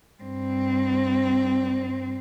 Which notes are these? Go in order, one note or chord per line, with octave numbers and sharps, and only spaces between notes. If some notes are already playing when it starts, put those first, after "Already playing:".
G2 C4